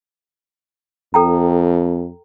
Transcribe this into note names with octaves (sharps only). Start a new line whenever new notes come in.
F2 A4 G5 A#5